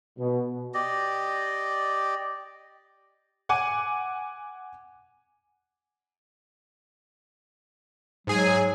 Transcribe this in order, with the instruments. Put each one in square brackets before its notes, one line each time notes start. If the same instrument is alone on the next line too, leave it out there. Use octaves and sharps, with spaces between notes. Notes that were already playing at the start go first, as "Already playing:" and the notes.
[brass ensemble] B2
[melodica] G4 D5 D#5
[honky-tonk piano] F#5 G#5 D6
[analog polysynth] G#2 G#4 G#5 [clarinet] F#3